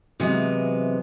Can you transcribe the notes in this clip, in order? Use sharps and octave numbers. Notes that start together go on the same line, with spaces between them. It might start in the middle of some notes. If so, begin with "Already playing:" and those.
C3 E3 F#3 G#3 B3